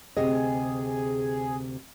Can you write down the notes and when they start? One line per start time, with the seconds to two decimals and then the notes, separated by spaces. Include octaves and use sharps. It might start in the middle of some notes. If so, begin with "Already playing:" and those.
0.17 D2 C3 G#4 D#5